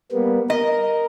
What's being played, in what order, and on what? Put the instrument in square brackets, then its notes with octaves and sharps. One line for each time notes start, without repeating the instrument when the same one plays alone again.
[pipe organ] G3 A#3 B3
[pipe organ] A#4 [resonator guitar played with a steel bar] D#5